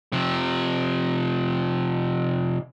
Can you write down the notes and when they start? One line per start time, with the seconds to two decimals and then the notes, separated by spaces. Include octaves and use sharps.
0.12 C3 F3